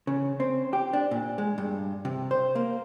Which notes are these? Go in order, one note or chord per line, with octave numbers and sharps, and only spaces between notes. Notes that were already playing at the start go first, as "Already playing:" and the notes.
C#3
C4
G4
D4
A#2
G#3
G2
C3
C5
A#3